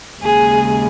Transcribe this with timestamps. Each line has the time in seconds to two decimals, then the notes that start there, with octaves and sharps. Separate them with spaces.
0.20 D#2 C#3 G#3 G#4